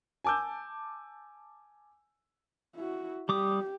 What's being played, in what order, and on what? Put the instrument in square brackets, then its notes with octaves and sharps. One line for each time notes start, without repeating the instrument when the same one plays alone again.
[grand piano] G#5 A5 D6 E6 G6
[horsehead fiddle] E4 F#4
[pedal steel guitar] G3 D6 D#6 [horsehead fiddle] G4